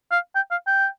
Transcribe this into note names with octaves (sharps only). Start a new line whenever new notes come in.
F5
G5
F5
G5